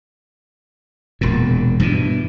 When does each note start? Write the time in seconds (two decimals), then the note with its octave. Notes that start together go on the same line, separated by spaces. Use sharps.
1.21 E1 A#2
1.80 G2 B2 E3